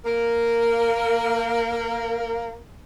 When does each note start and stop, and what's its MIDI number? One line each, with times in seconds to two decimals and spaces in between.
0.04 2.58 58
0.04 2.58 70